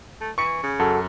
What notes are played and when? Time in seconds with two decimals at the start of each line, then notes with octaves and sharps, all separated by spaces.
0.21 A3
0.38 E3 C#6 C#7
0.63 C#3
0.79 F#2 F#4 A4